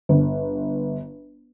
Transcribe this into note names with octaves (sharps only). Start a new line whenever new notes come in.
G1